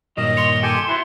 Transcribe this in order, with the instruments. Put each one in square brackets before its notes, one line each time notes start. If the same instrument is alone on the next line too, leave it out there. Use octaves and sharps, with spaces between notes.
[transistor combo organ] G2 A#2 D#3 [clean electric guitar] F#3 C#4 [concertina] D#5
[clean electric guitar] C#5 [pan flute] C6
[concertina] G4 G5 G#5 [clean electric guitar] A4
[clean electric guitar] B3 F#4 C5 [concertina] E4